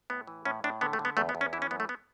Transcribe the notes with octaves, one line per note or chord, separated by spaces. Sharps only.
A2 B3
E3
A2 C#4
A2 D4
D3 B3
A3
D3
B3
E2 A3
B3
E2
C#4
E3 E4
C#4
F#2 B3
A3
B3